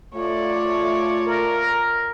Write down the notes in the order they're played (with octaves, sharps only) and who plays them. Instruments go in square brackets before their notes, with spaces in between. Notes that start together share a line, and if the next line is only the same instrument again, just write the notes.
[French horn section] A3 F4 [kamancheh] C#5 D5
[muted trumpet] A#4